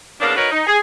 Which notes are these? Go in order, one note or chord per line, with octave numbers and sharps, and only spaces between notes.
E2 C#3 A#3 D4
D#4 F#4 A#4 B4 C#5
D#4
G#4